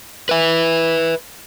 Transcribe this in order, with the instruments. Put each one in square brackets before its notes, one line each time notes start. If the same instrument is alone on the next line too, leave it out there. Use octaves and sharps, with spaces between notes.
[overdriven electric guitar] B4 E5